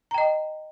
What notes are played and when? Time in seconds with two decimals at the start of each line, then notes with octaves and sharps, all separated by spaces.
0.11 A#5
0.14 G5
0.18 D#5